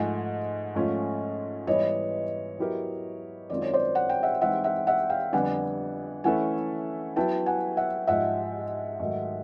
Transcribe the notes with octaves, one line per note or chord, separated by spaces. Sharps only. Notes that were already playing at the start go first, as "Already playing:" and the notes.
Already playing: G#2 F3 A3 F#5 G#5
G#2 F3 A3 C#4 F4
G#2 E3 G3 B3 E4 C#5 D#5
F#3 B3 E4 G4 A#4
F#2 D#3 G#3 C4 F4 D5
C#5
C5 D5
F#5
G5
E5 F#5
E3 G#3 C4 D#4 E5 F#5
E5 F#5
E5 F#5
F5 G5
F2 D3 G3 B3 D4 F#5 G#5
E3 A3 C#4 E4 A4 F#5 G#5
F#3 B3 E4 G5 A5
F#5 G#5
E5 F#5
G#2 F3 G#3 E5 F#5
G#2 D#3 F#3 A3